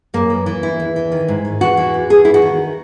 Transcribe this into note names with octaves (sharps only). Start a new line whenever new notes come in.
F#2 A#3
E3
E3
E2 E4
E2
E3
D#3
G#2
D#3
E2 F#4
E3
E2
E2 G#4
E2 E4
F#4
D#3